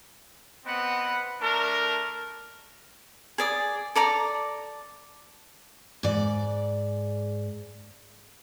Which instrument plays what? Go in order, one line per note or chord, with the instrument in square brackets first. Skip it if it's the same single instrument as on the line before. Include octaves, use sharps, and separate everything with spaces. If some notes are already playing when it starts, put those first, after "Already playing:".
[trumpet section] B3 C4 B4 D#5 F#5
A3 D4 A#4
[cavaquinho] G#4 D5 D#6
A4 D5 A#5 D6
[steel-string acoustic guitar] G#2 D5